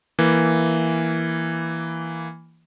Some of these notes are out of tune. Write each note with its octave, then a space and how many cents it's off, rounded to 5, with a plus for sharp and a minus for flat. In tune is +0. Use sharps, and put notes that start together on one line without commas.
E3 +0 A#3 +0